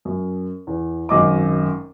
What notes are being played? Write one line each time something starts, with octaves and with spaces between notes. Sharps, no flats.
F#2
E2
G#1 F#2 D#5 D6